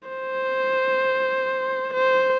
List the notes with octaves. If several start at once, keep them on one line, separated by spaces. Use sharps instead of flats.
C5
C5